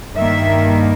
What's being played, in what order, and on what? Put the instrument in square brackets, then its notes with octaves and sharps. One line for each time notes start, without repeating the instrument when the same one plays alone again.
[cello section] G2 D#3 A#3 E5